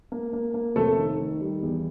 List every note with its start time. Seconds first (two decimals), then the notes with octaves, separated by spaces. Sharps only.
0.12 A#3
0.33 A#3
0.54 A#3
0.76 F1 A3 A4
0.97 D#3
1.20 D#3
1.41 G3
1.63 E2